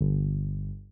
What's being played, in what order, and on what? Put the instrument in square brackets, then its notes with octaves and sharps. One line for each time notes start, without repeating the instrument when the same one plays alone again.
[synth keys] G1